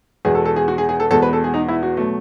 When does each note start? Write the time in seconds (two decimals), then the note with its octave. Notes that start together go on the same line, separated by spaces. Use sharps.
0.25 E2 B2 G#3 G#4
0.35 A4
0.45 A4
0.56 G#4
0.68 F#4
0.78 G#4
0.89 G#4
1.00 A4
1.11 E2 B2 G#3 A4
1.22 B4
1.33 A4
1.44 G#4
1.54 D#4
1.68 E4
1.83 F#4
1.97 B2 F#3 A3